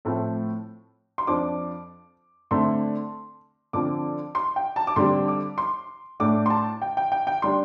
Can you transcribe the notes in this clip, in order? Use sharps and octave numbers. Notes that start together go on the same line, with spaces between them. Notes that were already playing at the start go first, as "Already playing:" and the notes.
A2 F3 A3 C4
C6
F2 F3 D4 D6
D3 A3 C4 C6
D3 F3 C4 D6
C6
G5
A5
D6
D3 G3 C4 C6
D6
C6
A2 A3 D4 D6
C6
A5
G5
G5
G5
G5
G3 D4 C6